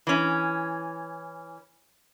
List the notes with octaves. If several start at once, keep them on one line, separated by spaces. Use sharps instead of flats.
E3 C#4